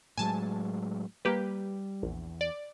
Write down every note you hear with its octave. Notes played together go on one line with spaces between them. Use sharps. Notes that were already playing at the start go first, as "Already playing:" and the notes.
A2 F#3 G#3 G#5 A5
G3 A#3 G4 B4
A#1 E2
D5